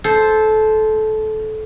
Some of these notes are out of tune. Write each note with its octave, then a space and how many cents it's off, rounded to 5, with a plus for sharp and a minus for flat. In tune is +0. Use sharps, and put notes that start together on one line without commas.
A4 -20 C5 +0